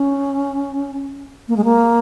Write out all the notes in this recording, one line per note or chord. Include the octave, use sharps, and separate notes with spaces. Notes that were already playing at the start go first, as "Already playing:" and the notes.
Already playing: C#4
A#3
G#3
A#3